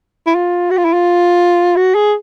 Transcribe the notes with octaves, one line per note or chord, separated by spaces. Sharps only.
E4
F4
F#4
F4
E4
F4
F#4
G#4